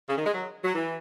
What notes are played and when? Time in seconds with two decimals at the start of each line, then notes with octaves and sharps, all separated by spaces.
0.09 C#3
0.17 D#3
0.26 G#3
0.34 F#3
0.64 F#3
0.75 E3